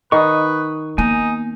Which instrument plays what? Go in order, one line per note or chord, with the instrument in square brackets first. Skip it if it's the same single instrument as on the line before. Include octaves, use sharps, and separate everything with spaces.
[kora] D#3 [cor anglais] B4 [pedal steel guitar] C#6 D#6
[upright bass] A#3 B3 [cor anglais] D#4 [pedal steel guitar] G#5